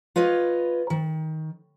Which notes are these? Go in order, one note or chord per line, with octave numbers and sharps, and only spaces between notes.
F4 B4 C#5 D#5
D#3